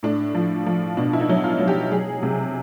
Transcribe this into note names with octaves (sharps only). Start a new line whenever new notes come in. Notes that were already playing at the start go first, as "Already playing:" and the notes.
A2 D4
F3
F3
B2 D4
E4
D#4
F#3
F4
F#3
G4
F#3 G#4
C3